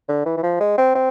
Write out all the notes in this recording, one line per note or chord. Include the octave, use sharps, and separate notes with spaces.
D3
E3
E3
F3
G#3
C4
C4